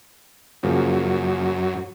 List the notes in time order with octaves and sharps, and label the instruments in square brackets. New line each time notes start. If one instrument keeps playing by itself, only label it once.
[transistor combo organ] F#2 [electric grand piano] C#3 F3 A#3